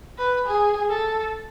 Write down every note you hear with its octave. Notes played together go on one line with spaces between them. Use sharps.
B4
G#4
A4